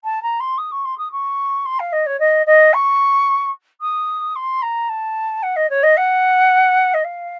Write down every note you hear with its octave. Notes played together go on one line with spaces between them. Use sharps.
A5
A#5
C6
D#6
C#6
C6
D#6
C#6
C6
F5
D#5
C#5
D#5
D#5
C#6
D#6
C6
A#5
A5
F#5
D#5
C#5
D#5
F#5
D#5
F5